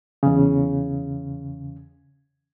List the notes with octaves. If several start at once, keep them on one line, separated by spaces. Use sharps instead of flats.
E2 C#3